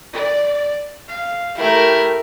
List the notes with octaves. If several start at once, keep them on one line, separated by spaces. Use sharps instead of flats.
D5
F5
A3 E4 G4 A#4